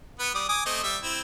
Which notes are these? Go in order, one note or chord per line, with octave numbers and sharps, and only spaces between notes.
B3 B4
G3 D5 D#6
G#5 D6 D#6
A3 C4 D#5
G3 E5
C4 E4